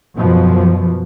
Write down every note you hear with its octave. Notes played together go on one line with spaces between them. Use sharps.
F#2 B2 F3